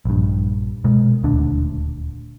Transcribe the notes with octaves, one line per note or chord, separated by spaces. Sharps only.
A#1 G2
B2 G#3
D#1 D2 D4